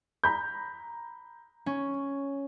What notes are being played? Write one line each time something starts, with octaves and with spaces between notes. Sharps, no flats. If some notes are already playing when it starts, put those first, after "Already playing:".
A#5 B5 G6
C#4